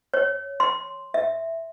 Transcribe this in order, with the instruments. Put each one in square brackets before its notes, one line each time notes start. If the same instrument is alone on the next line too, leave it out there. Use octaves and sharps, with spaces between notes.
[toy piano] C#5
C6
E5